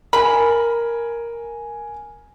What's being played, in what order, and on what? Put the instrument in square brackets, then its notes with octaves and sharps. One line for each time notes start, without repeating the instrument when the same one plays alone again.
[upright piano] A#4 G#5 [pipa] B5